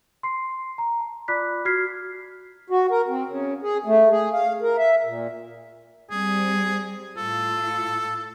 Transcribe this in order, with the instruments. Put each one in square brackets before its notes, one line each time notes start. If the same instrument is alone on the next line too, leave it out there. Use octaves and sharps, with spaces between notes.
[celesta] C6 C7
A#5
A5
F4 D5 B5 D6 F#6 B6
F#4 F6 G#6 B6 C7
[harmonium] F#4
A#4
C4
C#3
G#4
A3
G#4
F5
A#4
E5
A#2
[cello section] G3 C4 [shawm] G#4
[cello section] A2 F4 [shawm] A4